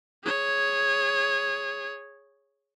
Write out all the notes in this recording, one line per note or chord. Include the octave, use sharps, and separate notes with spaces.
G#4 C#5